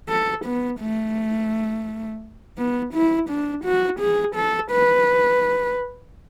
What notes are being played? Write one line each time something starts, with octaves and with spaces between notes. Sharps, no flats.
A4
B3
A3
B3
E4
D4
F#4
G#4
A4
B4